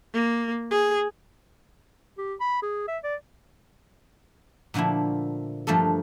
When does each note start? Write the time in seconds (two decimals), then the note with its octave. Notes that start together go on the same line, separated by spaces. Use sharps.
0.14 A#3
0.71 G#4
2.18 G4
2.40 B5
2.62 G#4
2.88 E5
3.03 D5
4.74 A#2 D3 F3 A3 E4
5.67 G2 F3 A3 A#3 A4